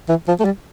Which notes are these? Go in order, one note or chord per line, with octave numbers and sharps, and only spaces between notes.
E3
F3
A3
G3